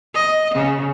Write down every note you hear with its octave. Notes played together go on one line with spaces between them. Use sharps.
D#5
C#3